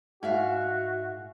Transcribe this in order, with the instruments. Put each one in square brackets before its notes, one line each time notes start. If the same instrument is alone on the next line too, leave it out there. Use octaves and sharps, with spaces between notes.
[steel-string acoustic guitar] G#2 E5 F5 [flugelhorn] F#4